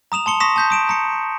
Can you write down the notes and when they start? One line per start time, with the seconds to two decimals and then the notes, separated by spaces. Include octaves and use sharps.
0.12 A#5 D#6 E7 F7
0.26 A5 C6 C#7 G7
0.40 C6 C#6 D#6 A#6 B6 E7
0.56 A5 G6 B6
0.70 D#6 D7 E7
0.89 A#5 C#7